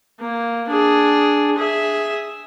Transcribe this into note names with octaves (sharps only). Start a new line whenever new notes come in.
A#3
D4 G#4
G#4 E5